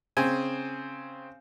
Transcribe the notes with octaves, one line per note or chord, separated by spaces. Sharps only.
C#3 C4 G#5